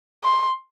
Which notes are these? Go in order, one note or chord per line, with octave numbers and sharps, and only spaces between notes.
C6